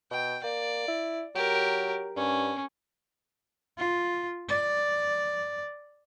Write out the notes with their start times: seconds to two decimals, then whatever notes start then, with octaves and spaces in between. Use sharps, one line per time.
0.11 B2 G5
0.44 A#3 D5
0.88 E4
1.35 F#3 G4 A#4
2.16 G2 C#4
3.77 F4
4.48 D5